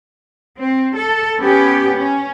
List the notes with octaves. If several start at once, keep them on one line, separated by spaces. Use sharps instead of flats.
C4
A4
B3 C#4 G4
C#4